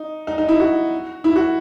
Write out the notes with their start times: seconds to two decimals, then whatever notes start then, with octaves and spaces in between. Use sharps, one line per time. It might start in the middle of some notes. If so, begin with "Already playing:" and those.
Already playing: D#4
0.27 D#4
0.38 D#4
0.48 E4
0.60 F#4
1.24 E4
1.36 F#4